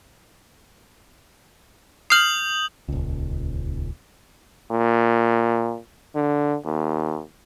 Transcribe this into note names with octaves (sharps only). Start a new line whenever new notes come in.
D#6 F6 G6 C7 F#7
D#1 C#2
A#2
D3
D#2